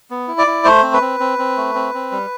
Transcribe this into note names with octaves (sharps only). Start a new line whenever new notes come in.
B3
E4
D5
E4
A3 C5
C4
B4
C4
C4
C4
A3
C4
C4
G3